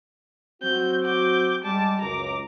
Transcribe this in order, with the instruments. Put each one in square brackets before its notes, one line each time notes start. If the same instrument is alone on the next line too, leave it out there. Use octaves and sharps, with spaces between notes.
[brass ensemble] F#3 C4 F#4 [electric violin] G6
[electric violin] D6 G6
[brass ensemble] G3 G#3 [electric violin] A5 D6
[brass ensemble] C#2 F#2 [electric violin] A#5 D6